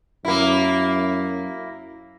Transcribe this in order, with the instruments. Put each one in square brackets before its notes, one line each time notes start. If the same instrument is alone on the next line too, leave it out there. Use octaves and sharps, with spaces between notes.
[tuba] F#2 [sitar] A#3 E4